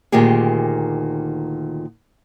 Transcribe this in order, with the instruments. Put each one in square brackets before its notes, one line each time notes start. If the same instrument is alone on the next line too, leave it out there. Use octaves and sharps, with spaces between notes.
[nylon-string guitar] D2 A#2 D#3 F4 G4 G#4